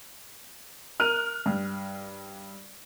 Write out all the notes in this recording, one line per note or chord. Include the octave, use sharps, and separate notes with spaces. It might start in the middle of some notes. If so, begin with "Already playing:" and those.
A#4 F6 F#6 D#7
G2